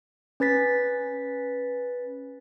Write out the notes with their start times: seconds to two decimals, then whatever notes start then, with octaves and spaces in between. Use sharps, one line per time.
0.40 C#4 B4 A6 B6